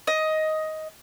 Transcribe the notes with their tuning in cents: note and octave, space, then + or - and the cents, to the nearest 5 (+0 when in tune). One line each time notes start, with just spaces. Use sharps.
D#5 +10